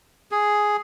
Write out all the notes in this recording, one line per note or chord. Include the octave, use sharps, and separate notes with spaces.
G#4